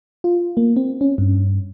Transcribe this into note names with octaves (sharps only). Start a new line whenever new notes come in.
F4
A#3
C4
C#4
G2